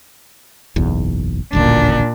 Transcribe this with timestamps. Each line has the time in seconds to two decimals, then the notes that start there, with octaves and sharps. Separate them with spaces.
0.76 F#1 B1 E2
1.53 D#1 A1 D2 A#2 D4